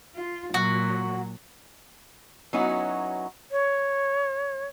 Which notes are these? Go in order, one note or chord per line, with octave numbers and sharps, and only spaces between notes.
F4
A#2 F#3 F#4
F#3 B3 C#4 D#4 E4 F#4
C#5